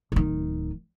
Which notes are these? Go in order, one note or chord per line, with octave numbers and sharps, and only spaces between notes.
D1 D#3